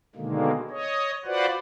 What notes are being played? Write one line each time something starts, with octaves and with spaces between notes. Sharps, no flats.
B2 D3 D#3 G#3 A#3
C#5 D#5
F4 F#4 B4 C5 D5 F#5